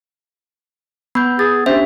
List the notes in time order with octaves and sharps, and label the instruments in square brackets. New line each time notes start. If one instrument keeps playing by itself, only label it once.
[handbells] B3 [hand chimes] B5 G6
[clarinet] G#4 [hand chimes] A6
[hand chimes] C#4 D4 G4 [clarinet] C5 [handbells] E5